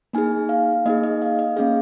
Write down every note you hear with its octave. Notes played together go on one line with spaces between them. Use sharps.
A#3 D#4 G#4 G#5
F5
A#3 D#4 G#4 D#5
D#5
F5
D#5
A#3 C#4 G#4 F5